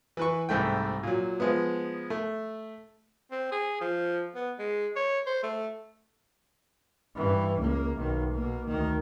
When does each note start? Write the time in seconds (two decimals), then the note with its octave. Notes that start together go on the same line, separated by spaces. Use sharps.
0.17 E3 B4 C#6
0.49 C2 G#2 A3 G5
1.03 A#2 F#3
1.40 F3 G#3 B3
2.10 A3
3.31 C4
3.52 G#4
3.81 F3
4.35 B3
4.59 G#3
4.96 C#5
5.26 C5
5.43 A3
7.16 G2 E3
7.60 C#2 A#3
7.98 B1 D#3
8.33 B2 A#3
8.67 D2 D#3